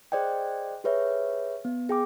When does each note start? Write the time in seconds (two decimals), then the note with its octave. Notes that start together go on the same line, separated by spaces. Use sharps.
0.12 G#4 C5 D5 D#5 G5
0.84 G4 G#4 B4 C#5 E5
1.65 B3
1.89 G#4 G5 D6